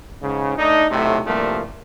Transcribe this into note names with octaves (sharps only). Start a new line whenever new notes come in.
G#2 C#3
A3 D4 D#4
B1 A2 C3 A3
C2 G2 F3 A3 A#3